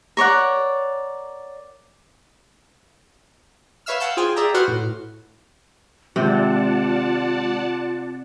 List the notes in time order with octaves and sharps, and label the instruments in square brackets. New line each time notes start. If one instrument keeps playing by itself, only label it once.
[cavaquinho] A#4 C#5 D5 F#5
[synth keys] B4 C#5 E5 F5 E6 F6
F5 F#5 A5 E6 G6
F4 G#4 C5 G5 G#5
G#4 D5 E5 G5 A#5
F#4 B4 C5 F#5 C6 F6
A2
[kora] C3 C4 [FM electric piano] D#3 G#3 [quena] F4 [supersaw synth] D5 F#5 A5